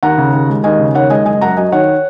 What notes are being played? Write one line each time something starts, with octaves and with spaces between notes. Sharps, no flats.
D#2 F#5 A#5
C#3
D#2
G#3
D#2 D#5 G#5
C#3
D#2 C#5 F#5
G#3 D#5 G#5
F#1 D#5 G#5
F#2 F#5 A#5
F#3 D#5 G#5
D#3 C#5 F#5